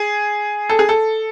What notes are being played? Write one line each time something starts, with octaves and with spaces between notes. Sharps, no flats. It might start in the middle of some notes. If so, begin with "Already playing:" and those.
Already playing: G#4
A4
G#4
A4